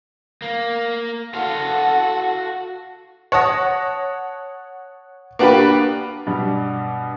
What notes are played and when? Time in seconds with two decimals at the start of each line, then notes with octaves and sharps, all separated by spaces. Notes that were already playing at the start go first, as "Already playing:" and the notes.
0.42 A#3
1.34 F#4 A4 F5 F#5
3.32 C#5 F#5 A5 D#6 A#6
5.39 A#3 B3 D4 F#4 G4 B4
6.26 G2 B2 G3